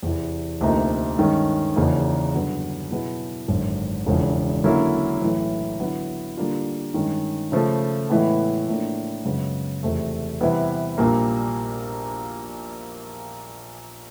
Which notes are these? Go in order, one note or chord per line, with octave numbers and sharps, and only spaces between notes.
E2 C3 E3
D2 C3 F3 A#3 D#4
G2 D#3 G#3 C#4
E2 C#3 F3 A#3 D#4
G2 D3 F#3 B3
B2 F#3 B3 E4 G#4
G#1 F#2 D3
E1 E2 C#3 F3
D3 F#3 A#3 C#4 E4
B1 A2 E3
D3 F#3 B3 E4
D3 G3 A#3 D4 F4
G2 D#3 G#3 C#4
C#3 F3 A3
A2 E3 G#3 B3
A2 F3 A#3 D4
F#2 C#3 F3 G#3 B3
E2 C3 F3 A3
C3 E3 G3 B3 E4
A#1 A#2 G3 A#3